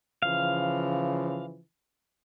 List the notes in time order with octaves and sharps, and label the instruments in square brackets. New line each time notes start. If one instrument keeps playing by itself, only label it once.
[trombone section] C#3 E3 F3 [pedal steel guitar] F5